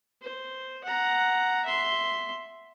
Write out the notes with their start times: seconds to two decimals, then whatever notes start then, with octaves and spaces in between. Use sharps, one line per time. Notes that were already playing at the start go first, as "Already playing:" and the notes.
0.22 C5
0.84 F#5 A#5
1.66 E5 C6